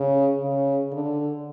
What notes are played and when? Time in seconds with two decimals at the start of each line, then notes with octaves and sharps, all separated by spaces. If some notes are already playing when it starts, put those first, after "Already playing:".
Already playing: C#3
0.41 C#3
0.92 D3